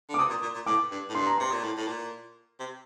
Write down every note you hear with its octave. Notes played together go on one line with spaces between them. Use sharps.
D3
D6
C3 D#6
A#2
A#2
A#2
A2 D6
G2
A2
G2 C6
A#5
C3 C6
A#2
A2
A2
A#2
C3